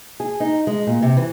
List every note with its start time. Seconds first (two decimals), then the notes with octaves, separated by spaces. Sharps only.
0.20 G#4
0.40 D#4
0.67 G#3
0.87 A#2
1.02 C3
1.17 E3